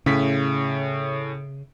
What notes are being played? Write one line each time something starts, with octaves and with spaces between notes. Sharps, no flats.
A2 C#3 C#4 B6